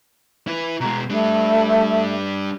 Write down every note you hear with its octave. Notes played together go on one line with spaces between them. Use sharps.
E4 B4
B2 G#3 A#5
G3 A3 D4